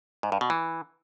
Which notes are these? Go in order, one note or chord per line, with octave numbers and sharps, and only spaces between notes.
G#2
G2
B2
E3